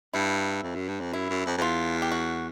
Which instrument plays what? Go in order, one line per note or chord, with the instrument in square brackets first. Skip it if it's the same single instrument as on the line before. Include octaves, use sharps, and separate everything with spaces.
[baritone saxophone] G2 [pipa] E4
[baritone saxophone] F2
F#2
G2
F2
[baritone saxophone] F#2 [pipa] E4
[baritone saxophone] F#2
F2
F2
[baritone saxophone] E2 [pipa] F4
[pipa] G4
F#4